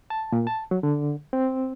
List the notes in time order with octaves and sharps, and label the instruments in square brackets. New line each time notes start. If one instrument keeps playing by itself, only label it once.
[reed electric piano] A5
A#2
A5
F#3
D3
C4